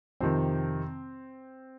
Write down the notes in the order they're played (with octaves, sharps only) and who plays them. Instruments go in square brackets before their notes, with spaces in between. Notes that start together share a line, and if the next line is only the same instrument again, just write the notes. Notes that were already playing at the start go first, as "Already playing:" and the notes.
[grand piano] F2 C3 D#3 C4